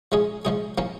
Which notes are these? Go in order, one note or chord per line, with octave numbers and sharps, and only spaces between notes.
F3 G#3 C#4 G#4
F3 G#3 C#4 G#4
F3 A#3 C#4